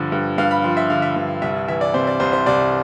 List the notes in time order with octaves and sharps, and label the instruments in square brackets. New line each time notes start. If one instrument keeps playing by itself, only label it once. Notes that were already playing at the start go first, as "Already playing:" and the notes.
Already playing: [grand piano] G2 D3 F3
G2
G2 F5
B5
F3 C6
E5
D3 F5
E5
G2
C2 E5
E3 E5
D5
C3 C5
D5
C2 C5
C5
C2 D5